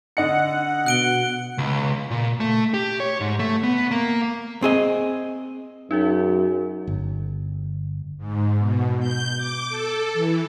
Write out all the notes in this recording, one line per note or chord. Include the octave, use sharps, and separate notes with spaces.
D3 D#5 F#5 C#7
B2 F#6 D7 G7
C#2
A#2
A3
G4
C#5
G#2
A3
B3
A#3
C4 G#4 D#5
F#2 D#4 F#4 G#4
G1
G#2
B2
G6
D6
A4
E3